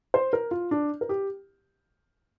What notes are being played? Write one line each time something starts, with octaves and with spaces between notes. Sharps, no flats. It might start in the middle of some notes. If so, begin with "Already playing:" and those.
C5
A#4
F4
D4
A#4
G4